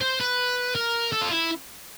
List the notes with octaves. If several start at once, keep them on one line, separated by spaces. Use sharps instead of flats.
C5
B4
A#4
A4
F4
E4